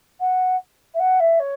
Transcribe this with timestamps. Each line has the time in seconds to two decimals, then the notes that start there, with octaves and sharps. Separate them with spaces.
0.20 F#5
0.94 E5
0.99 F#5
1.20 E5
1.40 C#5